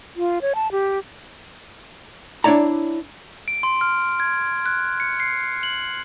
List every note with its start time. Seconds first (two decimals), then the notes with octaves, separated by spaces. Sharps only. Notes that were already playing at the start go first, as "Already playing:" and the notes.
0.16 F4
0.42 C#5
0.55 A5
0.72 G4
2.44 D4 E4 C#5 D5 A#5
3.48 D7
3.63 C6
3.81 F6
4.20 G#6
4.66 F#6
5.00 C#7
5.20 C7
5.63 F#7